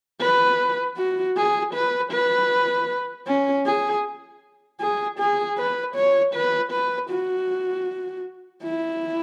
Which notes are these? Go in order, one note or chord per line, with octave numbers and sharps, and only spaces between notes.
B4
F#4
G#4
B4
B4
C#4
G#4
G#4
G#4
B4
C#5
B4
B4
F#4
E4